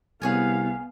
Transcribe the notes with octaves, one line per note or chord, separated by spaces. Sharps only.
C2 B3 G#4 C#5 F5 G#5